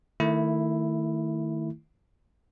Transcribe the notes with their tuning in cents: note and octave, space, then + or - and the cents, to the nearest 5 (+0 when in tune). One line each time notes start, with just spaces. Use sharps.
D#3 +0 A3 +20 E4 +0